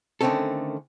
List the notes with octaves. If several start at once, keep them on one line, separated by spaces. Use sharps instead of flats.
D3 D#3 A3 C4 C#4 A4